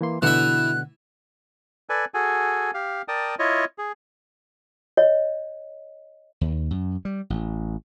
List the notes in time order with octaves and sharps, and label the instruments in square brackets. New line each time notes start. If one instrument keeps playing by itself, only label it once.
[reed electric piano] E3 A#3 C6
[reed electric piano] B2 D3 F#5 [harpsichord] E3 E5 [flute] F#6
[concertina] A4 B4 D5 G#5
F#4 G#4 A4 G#5
G4 F5
A#4 D5 G5 A5 D#6
E4 F4 C#5 D#5
G#4
[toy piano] C#5 D#5
[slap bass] D#2
F#2
G3
A1